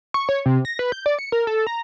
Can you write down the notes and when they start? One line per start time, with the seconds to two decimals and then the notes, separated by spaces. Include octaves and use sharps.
0.14 C#6
0.29 C#5
0.46 C3
0.65 A#6
0.79 B4
0.92 G6
1.06 D5
1.19 C#7
1.32 A#4
1.47 A4
1.67 A#5